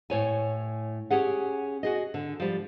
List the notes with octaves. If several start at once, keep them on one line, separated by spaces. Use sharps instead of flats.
A2 C#5 G#5
C#4 G4 G#4 F#5
F#4 G#4 D#5
D3
F3 G3